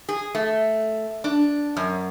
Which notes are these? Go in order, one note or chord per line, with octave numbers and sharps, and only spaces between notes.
G#4
A3
D4
F#2